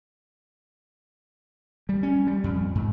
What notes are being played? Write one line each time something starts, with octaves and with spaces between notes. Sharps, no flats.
G3
C#4
G3
F2
G#2